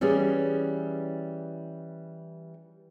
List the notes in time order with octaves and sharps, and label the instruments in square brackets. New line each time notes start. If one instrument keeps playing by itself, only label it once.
[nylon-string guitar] E3 G3 C#4 G4 G#4